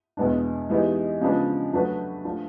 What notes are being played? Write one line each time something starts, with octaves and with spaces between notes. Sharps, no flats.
E2 B2 G#3 B3 D4
E3 G#3 B3 D#4 G4
C#3 F3 G#3 B3 D4
F#3 A3 D4 F#4 B4
F3 A3 D4 F4